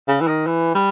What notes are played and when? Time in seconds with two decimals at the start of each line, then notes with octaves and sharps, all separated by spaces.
0.08 C#3
0.21 E3
0.27 D#3
0.46 E3
0.75 G3